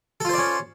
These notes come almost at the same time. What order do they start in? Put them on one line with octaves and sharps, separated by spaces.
A4 F4 C5 D5 C#4